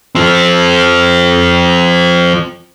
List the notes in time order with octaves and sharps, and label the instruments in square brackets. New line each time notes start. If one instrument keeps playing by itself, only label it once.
[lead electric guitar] F3 C4